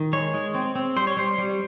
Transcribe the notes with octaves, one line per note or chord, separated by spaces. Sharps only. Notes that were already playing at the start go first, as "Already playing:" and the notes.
Already playing: D#3
G#3 C#5
G#3
C4
C4
G3 C5
C#5
G3 C5
G3